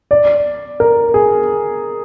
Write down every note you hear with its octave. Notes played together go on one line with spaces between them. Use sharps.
D5
A#4
G#4